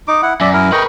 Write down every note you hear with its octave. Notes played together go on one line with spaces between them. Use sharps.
D#4 D6
E4 F#5
F#2 D5 E5
E4 A#4
A#4 B4 D#5 G5 C#6